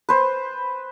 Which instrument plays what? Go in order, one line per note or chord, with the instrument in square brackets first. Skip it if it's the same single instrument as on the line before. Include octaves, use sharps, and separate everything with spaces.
[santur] B4 C5